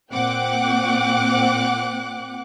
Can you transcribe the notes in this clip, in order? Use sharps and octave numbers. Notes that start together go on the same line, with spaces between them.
A#2 C4 F#5 G5 D6 F#6